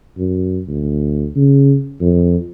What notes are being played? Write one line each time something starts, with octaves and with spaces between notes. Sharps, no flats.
F#2
D2
C#3
F2